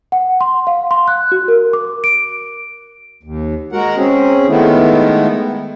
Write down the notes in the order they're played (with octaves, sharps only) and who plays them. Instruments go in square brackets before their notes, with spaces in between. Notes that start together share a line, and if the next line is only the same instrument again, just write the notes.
[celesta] F#5
C6
F5
C6
F#6
F#4
A#4
D6
D7
[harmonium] D#2
G#3 F#4 A#4 F#5
C4 C#4 G#4
D#3 G#3 A3 B3 E4